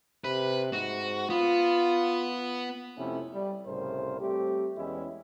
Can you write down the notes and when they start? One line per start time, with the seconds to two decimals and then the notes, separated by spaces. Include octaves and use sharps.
0.24 C3 B4
0.73 G#2 F#4
1.30 B3 F4
2.98 F2 C3 A3 C#4 E4
3.32 G3
3.66 C2 A2 C#3 A#4 C5
4.20 G3 A3 C4 G4
4.76 E2 G#3 C#4 E4